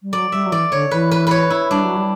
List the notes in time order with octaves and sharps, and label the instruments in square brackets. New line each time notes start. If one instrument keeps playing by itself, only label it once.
[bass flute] G3
[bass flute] F#3 [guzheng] D5
[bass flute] G3 [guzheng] E5
[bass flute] F#3
[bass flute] E3 [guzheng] D5
[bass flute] D3 [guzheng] C#5
[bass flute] E3 [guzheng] B4
[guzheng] B4
B4 C#5
E4
[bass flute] G3 [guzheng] D4
[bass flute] F#3
G3